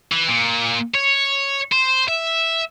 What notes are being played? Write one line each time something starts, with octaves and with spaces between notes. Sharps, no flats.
E3
A#2
C#5
C5
E5